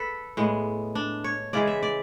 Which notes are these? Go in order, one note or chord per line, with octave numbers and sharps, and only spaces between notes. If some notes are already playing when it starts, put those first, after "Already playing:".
Already playing: A4 B4
A2 G#3 B3
D4
C#5
C#3 E3 G#3 D5
E5
D5